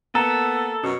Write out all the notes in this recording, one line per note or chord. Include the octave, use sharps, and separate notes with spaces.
A#3 B3 A4 A#5
F#2 B2 C#4